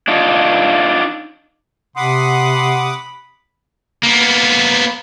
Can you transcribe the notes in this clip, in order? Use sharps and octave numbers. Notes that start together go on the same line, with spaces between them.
D4 D#4 F4
C3 F#5 B5 C6 D6 D#6
A#3 B3